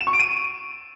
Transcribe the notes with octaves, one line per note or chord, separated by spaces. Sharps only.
E7
C#6
D7
D#7